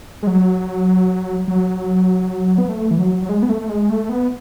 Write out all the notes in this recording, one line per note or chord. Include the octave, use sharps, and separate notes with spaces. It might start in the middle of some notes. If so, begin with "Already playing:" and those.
G#3
F#3
F#3
B3
A3
E3
F#3
F#3
G#3
B3
A3
G#3
A3
B3